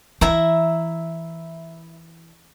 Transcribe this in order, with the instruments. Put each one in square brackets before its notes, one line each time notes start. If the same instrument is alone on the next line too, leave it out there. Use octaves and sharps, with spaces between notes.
[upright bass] E3 [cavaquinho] E4 E5 A#5